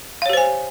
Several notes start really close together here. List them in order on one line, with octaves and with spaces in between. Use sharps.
F5 C#5 G4 C5 G#5